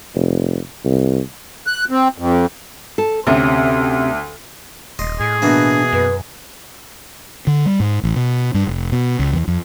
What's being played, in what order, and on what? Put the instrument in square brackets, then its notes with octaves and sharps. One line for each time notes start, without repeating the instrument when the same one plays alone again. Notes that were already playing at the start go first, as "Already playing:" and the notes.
[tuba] F1
C2
[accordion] F#6
C4
F2
[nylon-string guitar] A4
[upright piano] D2 [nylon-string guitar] C3 C#4
[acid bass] D#1 [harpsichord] D#5 C6
[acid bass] A2 [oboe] G#4
[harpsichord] B2 E3 A#3 [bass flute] D4
[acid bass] F#2 [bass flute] B4
[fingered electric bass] D3
G3
G#2
A1
B2
G2
F1
B2
C#2
E2
F2